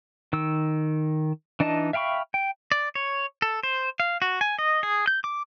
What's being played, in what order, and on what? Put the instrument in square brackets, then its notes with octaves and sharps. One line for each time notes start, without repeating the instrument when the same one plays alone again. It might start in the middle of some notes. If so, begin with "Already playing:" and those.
[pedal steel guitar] D#3 E6
E3 D4 D#4 D#5 A5
E5 F5 G5 B5 C#6
G5
D5
C#5
A4
C5
F5
F#4
G#5
D#5
G#4
G6
D6